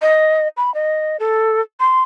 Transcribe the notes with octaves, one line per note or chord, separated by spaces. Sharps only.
D#5
B5
D#5
A4
C6